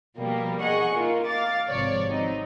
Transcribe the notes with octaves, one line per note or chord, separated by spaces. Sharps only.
B2 F3 G3 A#3
G#4 D#5 F#5 C#6
A#3 D#4 F4
F5 D6 A6
G#1 C3 F3 C#5 D5
F#3 C4 D#4